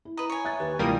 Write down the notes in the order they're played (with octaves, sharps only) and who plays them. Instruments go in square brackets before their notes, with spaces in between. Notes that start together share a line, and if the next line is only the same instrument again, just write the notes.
[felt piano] E4
[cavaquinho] B4 D#5 [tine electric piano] A#5
[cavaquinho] C#5 G#5
[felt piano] E5 F#6 A6
[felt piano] D#2 [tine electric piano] G4 B4
[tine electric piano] D2 C3 G#3 [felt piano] E3 F4 [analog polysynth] G3 A#3 D#6